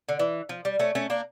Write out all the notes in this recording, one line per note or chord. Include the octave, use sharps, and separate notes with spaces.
D3
E3
F3
G3
A3 C#4
A3 C#4
A#3 D4